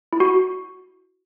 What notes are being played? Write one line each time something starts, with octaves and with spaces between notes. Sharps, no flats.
E4
F#4